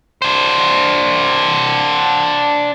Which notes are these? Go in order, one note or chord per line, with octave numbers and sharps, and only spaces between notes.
D4 C5